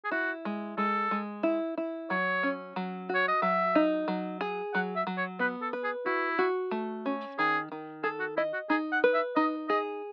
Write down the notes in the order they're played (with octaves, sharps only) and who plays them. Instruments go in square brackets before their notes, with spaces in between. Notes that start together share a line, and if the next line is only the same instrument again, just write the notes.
[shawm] G#4
[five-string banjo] E4 [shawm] F#4
[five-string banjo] G#3
[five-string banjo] G#3 [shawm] A4
[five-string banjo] G#3
E4
E4
[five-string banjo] F#3 [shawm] C#5
[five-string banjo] C#4
F#3
F#4
[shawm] C#5
D#5
[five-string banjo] F#3 [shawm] E5
[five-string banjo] D#4
F#3
G#4
[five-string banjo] F#3 [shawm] F#5
[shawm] E5
[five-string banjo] F#3
[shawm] C#5
[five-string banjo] B3 [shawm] B4
[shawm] A4
[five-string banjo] B4
[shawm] G#4
[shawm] E4 [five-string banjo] F#4
[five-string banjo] F#4
A3
C#4
[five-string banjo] D#3 [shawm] G#4
[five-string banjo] D#3
[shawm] G#4 [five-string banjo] A4
[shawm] F#4
[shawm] E4 [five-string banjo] D#5
[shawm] F#4
[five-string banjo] D#4 [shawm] G#4
[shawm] F#5
[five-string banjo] B4
[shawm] E5
[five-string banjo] D#4 [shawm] D#5
[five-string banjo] G#4 [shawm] D#5